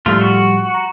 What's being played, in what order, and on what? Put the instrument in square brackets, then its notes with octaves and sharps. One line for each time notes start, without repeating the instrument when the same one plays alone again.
[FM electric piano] A2 F3 G3 [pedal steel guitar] A3 F4
[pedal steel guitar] F#4
[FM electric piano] A#5